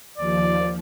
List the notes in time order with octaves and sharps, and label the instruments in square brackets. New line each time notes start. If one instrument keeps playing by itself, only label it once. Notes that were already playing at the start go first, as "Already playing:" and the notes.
[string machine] D#2 F3 [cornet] D5